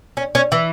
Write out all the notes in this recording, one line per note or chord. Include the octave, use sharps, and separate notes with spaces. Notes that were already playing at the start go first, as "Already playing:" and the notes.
C#4
C#4
E3